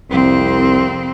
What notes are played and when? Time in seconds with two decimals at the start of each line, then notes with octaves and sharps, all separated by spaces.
0.10 C2 F2 C4